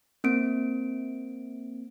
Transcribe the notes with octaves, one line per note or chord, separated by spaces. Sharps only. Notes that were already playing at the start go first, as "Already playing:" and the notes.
A#3 C4 D7